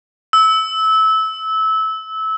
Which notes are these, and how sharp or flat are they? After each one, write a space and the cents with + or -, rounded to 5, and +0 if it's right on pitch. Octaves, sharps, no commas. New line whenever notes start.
E6 -20